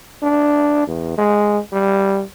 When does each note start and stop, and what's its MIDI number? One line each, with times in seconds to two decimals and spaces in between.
0.23 0.87 62
0.87 1.14 40
1.18 1.58 56
1.73 2.22 55